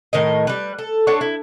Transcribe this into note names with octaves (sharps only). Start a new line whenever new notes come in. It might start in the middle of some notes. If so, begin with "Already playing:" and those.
A2 D#3 A#4 D#5
G3 B4
A4
D4 A4 C#5 F#5
E4